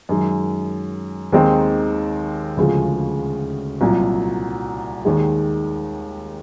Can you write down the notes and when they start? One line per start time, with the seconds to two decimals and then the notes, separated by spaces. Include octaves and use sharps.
0.09 F#2 D#3 G#3
1.32 D#2 D#3 G#3 C4 D#4
2.57 D2 C#3 F3 G#3
3.81 C2 A#2 F#3
5.05 D#2 D#3 G#3